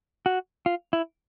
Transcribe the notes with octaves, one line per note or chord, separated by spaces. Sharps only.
F#4
F4
E4